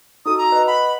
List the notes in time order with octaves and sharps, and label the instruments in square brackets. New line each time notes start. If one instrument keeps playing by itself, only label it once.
[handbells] D#4 F#4 A4 [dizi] D#6
[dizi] A#5
[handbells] B4 D#5
[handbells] F#5 [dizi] B5